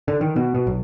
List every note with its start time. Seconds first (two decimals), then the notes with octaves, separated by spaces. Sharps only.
0.08 D3
0.21 D#3
0.36 B2
0.55 B2
0.67 B1